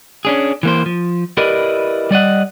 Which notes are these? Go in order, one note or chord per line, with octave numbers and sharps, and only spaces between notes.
C#4 D4 G#4
E3 A#3 C5
F3
E4 G4 A#4 B4 D5 D#5
G3 D5 D#5 F#5